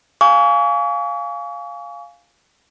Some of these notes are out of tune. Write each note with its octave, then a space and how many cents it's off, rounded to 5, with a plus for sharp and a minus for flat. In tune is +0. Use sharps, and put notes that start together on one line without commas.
F5 +0 G#5 +5 C#6 +40